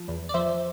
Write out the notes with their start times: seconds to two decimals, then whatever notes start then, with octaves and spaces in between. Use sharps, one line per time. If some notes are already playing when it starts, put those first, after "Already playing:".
Already playing: F3
0.08 E2
0.29 D5
0.34 F3 C5 E5